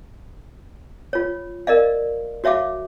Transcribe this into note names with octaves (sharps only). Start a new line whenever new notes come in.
F4 C#5
A#4 D5 D#5 F5
F#4 C#5 E5 F5 D6